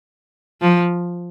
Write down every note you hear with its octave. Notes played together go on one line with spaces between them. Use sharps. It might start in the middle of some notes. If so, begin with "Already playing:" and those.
F3